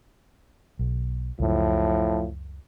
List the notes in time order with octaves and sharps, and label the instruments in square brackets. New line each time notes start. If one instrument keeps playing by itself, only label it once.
[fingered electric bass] B1
[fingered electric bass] C#2 F#2 [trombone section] A2 F3